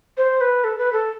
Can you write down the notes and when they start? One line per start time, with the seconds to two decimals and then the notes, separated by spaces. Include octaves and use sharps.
0.17 C5
0.41 B4
0.64 A4
0.78 B4
0.93 A4